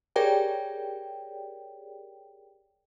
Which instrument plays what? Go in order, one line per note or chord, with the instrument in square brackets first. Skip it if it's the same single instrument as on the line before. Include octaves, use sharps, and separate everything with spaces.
[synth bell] G4 G#4 A#4 C#5 D5 G5